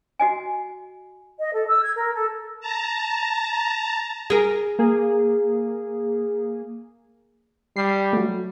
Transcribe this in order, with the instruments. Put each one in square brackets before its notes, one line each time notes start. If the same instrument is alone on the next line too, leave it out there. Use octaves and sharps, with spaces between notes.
[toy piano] F#4 D#5 G#5
[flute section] D#5
A4
E6
G#6
A#4
A4
[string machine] A5 A#5
[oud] G#4 A#4
[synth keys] A#3 G#4
[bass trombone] G3 [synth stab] C7
[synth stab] F#3 A3